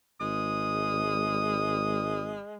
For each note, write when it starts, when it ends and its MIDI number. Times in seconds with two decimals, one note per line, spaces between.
0.21 2.35 32
0.21 2.57 56
0.21 2.39 87